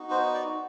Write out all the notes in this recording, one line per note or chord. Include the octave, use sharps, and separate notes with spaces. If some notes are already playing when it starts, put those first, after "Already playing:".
Already playing: B3 D#4 F#4
C5
D5